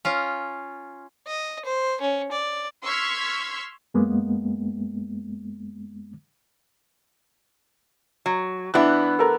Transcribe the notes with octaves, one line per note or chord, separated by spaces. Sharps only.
C#4 F4
D#5
C5
C#4
D5
C6 C#6 E6 F6 G#6 B6
F#2 G#3 A#3 B3
F#3
E3 B3 D4 E4 F#6
A4 A#4